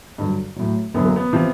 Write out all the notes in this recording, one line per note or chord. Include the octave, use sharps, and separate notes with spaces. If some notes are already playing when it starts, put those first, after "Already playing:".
G2 D3 F#3
A2 F#3
F#2 D3 F#3 B3
A#3
B3
C3 F3